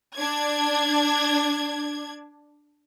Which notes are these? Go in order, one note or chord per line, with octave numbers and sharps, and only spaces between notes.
D4 G#6